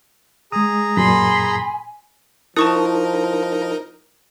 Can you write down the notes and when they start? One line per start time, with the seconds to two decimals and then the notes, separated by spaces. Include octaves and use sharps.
0.52 G#3 G#4 A#5 D#6
0.97 F#2 A#2 G#5 B5 C6
2.56 F3 D#4 E4 A#4 A5 C#6 D#6